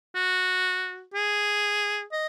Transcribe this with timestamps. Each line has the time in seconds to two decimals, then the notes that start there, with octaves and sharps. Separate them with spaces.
0.15 F#4
1.14 G#4
2.12 D#5